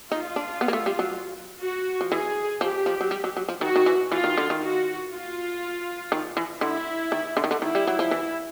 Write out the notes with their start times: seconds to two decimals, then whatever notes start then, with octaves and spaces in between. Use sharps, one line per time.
0.11 D#4 F4
0.36 D4
0.61 B3
0.68 A#3
0.73 A3
0.86 G3
0.99 F#3
1.61 F#4
2.01 F3
2.11 E3 G#4
2.61 F3 G4
2.86 F3
3.01 F#3
3.11 G3
3.24 F#3
3.37 F#3
3.49 F3
3.61 D#3 F#4
3.76 D#3
3.86 E3
4.12 E3 F4
4.24 D#3
4.37 D3
4.50 D#3
4.61 F#4
5.11 F4
6.12 D#3
6.37 E3
6.61 D3 E4
7.12 D#3
7.37 D3
7.44 D#3
7.51 D3
7.62 D#3 E4
7.75 G3
7.87 F#3
7.99 F3
8.11 E3